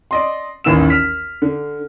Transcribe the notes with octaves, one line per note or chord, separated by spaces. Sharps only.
D5 D#5 C6
A1 D#2 E3 C#4 E6 E7
F6 B6
D3